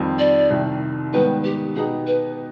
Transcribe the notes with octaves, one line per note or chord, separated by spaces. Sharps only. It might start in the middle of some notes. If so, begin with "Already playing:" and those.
Already playing: F2 D#3 G3 C4
D5
C2 C3 D#3
G#2 D#3 G3 B3 B4
G4
B2 B3 D#4 G4 G#4
B4